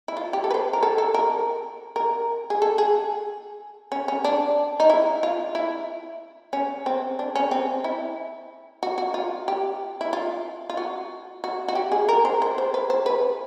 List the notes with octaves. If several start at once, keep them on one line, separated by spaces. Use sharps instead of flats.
E4
F4
G4
A4
B4
C5
A#4
A4
A4
A#4
A#4
G#4
A4
G#4
C#4
C#4
D4
D#4
E4
F4
E4
C#4
C4
D4
C#4
C4
E4
F#4
F#4
F4
G4
E4
F4
F4
F#4
F#4
F#4
G4
G#4
A#4
C5
C5
C5
B4
C5
B4